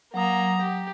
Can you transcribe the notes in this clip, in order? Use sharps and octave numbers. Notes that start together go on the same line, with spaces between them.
F#3 A#3 A#5 D#6
G4